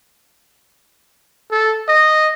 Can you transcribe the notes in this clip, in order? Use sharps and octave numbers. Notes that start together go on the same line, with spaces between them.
A4
D#5